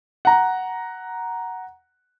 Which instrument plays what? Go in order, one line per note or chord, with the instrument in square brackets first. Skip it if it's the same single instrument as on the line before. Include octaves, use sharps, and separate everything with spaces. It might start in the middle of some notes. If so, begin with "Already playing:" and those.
[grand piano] F#5 A#5